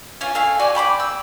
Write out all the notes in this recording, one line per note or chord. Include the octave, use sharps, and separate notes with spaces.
C#4 F4 G#5
A4 F5 G#5
F#4 G4 D5 G#5
G5 B5 C6 D6
E6